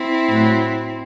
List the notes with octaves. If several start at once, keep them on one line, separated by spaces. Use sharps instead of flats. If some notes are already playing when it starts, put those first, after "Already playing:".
Already playing: C4 E4
A2
F#3